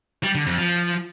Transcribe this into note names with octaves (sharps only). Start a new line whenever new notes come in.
G3
D3
F2
F3